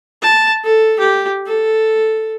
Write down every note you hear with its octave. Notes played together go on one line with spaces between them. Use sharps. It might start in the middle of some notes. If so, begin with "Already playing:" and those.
A5
A4
G4
A4